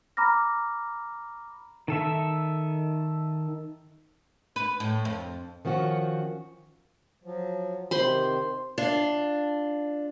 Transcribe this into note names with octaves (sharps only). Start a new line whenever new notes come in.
A#5 B5 D6 F6 A#6
D#3 A4 E5
B4
A2
F2
D#3 F3 C#4 F#4
F3 F#3
C3 D#3 C5 B5 C6
D4 F4